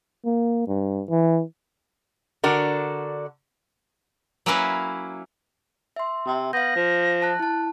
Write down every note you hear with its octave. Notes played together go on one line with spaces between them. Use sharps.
A#3
G2
E3
D3 D4 F#4 A#4
F#3 A#3 C#4 E4 A#4 B4
E5 C6
C3
B3 F5 G6 A#6
F3
A5 F#6
E4 A5